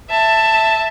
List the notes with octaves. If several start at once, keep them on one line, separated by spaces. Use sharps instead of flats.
E5 A5